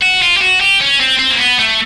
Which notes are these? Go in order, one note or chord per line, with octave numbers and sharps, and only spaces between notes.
F#4
F4
G4
F#4
G4
C#4
C4
C4
A#3
B3
A3